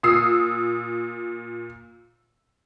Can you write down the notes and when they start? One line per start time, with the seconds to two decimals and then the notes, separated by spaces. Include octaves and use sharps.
0.03 A#2 D#6 E6 C7